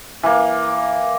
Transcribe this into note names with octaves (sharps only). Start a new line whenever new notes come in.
E3 A#3